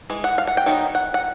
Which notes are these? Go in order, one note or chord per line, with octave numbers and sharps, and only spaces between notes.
E3 G#3
F#5
F5
F#5
G5
D#3 F#3 B3 D#4
F#5
F#5